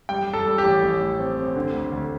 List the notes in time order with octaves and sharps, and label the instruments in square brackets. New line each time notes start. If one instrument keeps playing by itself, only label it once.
[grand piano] G3 G5
G3
A4
G3
G4
A1
A1
A2
C4
C4
D3
D2
D2